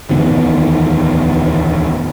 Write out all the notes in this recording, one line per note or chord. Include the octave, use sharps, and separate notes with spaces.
D1 E2 D#3 B3